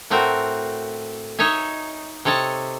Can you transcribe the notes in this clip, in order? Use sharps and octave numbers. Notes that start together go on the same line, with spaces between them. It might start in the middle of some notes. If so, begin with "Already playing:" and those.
A2 A3 C4 F#4 A#4
D#4 C#5 D#5 E5 G#5
C3 A4 C#5 D#5 A5